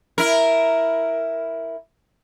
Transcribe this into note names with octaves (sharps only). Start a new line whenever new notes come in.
E4 A#4